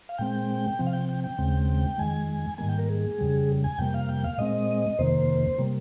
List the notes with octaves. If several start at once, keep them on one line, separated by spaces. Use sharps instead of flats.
F5
A#2 G#3 C4 G5
C3 F3 C4
F5
G5
G5
G5
D#2 C#3 G#3 C4
F2 D#3 G#3 G#5
G#2 D#3 G3 A#3 G#5
G5
A#4
G#4
F2 C#3 G3
G#5
F2 C3 G3 A#3 G5
F5
G5
F5
A#2 G#3 C4 D#5
F2 C3 D#3 A#3 C5
C3 G3 A#3